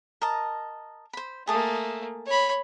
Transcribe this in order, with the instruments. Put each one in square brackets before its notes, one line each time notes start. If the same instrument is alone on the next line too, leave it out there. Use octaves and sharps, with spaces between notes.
[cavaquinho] A#4 D#5 A5
C5 B5
[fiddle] A3 A#3 [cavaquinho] G#4 A5 D#6
[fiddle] C#5 B5